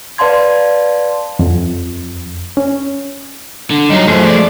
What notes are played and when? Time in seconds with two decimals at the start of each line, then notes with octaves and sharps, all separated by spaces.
0.18 B4 D5 F5 A5 C6 G#6
1.39 F2
2.57 C#4
3.71 D3
3.90 F#3 G3 D#4 F4
4.08 F#2 F3 A3 G#4
4.26 D5